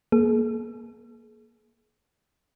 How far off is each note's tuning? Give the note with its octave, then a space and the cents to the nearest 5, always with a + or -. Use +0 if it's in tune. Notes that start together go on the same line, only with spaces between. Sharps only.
A#3 +15 G#4 +40